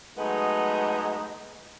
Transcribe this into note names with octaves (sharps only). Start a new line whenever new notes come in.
F#3 G#3 A3 B3 D#4